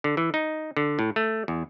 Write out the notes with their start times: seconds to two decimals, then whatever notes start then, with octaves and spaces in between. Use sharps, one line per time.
0.04 D3
0.17 E3
0.34 D#4
0.77 D3
0.99 A2
1.16 A3
1.48 E2